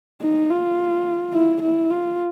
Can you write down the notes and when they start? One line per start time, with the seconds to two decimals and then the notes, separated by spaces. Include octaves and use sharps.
0.22 D#4
0.50 F4
1.34 E4
1.62 E4
1.90 F4